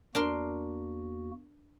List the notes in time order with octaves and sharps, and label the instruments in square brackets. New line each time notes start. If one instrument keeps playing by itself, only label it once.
[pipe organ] E2 A#3 F#4 [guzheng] D4 A#4 C6